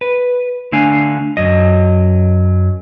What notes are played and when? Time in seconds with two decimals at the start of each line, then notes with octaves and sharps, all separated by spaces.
0.01 B4
0.72 D3 A3 D4 F5 G#5
1.37 F#2 F#3 D#5